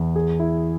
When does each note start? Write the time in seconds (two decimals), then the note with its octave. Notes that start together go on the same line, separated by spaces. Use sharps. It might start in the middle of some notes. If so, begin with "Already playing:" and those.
Already playing: E2
0.16 G#4
0.40 E4